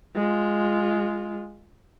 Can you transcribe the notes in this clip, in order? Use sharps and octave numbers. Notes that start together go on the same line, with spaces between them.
G#3 F4